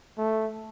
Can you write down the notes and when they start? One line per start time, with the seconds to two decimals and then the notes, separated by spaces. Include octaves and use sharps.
0.18 A3